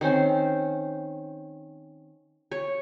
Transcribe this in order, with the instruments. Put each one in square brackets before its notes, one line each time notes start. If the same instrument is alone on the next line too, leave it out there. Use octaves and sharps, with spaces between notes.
[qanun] D#3 C4 C#4 C5
C#5 C#6